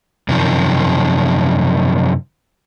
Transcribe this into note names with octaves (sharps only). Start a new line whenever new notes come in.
F#2 C3 D#3 F3